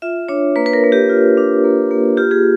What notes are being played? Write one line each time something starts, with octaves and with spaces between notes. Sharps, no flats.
F4 E5
D4 C#5
A#3 B4
B4
A#4
A#3
G4
F4
D4
A#3
A#3
F4 G4
G#4